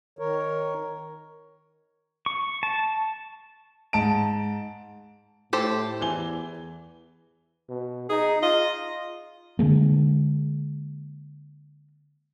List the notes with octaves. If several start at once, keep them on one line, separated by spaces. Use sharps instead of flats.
D#3 A#4 C#5
C#6
A5
G#2 A5 D7
A2 G4 A4 C5
E2 E3 G#5 G7
B2
D#4 G#4
F4 D#5
D3 F3 G#3 A#3